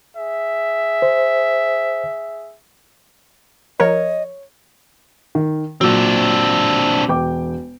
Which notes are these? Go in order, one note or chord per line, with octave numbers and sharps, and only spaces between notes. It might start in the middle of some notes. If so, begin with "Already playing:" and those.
G#4 E5
C5
F3 A#4 C#5 D#5
D#3
A#2 F#3 C4 D4
E1 G5 D6